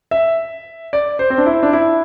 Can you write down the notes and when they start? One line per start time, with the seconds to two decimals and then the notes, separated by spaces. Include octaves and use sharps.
0.11 E5
0.93 D5
1.19 C5
1.30 C4
1.38 D4
1.46 E4
1.63 D4
1.73 E4